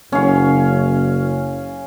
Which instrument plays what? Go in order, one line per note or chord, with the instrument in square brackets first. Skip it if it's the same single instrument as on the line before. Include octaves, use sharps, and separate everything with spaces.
[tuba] F#1 [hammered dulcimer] C#4 F5